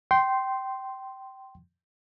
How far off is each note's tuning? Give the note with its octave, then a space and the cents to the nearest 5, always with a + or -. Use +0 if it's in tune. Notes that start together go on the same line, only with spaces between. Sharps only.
G5 -20 C6 +0